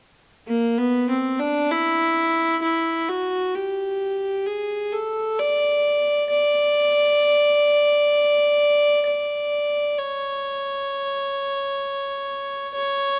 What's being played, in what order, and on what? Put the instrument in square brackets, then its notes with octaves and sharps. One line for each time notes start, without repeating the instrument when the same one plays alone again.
[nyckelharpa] A#3
B3
C4
D4
E4
E4
F#4
G4
G#4
A4
D5
D5
D5
C#5
C#5